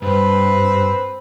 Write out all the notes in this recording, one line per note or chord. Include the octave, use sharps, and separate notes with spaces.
G2 C4 B4